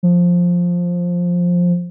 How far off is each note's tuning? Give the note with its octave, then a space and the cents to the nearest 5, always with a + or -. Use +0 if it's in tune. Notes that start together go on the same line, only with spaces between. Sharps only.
F3 +10